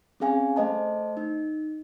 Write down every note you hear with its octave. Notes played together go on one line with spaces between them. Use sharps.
C4 C#4 G#4 F5 G#5
A3 C5 D#5 A5
D#4